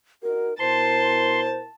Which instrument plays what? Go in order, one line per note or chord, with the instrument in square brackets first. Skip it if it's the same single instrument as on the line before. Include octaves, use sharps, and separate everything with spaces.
[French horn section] D#4 F#4 [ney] A#4
[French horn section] B2 E4 A#4 [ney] C5 [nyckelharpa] A5 [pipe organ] C6